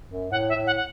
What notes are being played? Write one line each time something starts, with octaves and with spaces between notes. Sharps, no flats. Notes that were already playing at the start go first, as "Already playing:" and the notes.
F#2
A2 F#5
E5
A2
F#5
F#5